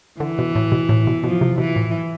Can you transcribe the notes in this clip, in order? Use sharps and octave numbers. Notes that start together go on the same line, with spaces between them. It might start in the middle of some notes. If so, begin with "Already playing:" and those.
D3 E3
B2
A2
B2
A2
B2
B2 F3
C3
B2 E3
A2